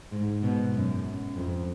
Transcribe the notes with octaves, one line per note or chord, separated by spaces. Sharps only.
G#2
B2
F#2
F2